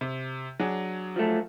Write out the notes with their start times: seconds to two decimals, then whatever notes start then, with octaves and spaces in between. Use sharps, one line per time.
0.01 C3
0.60 F#3 D4 G#4
1.16 F3 A3